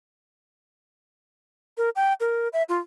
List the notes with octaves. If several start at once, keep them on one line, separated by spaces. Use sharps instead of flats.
A#4
G5
A#4
E5
F4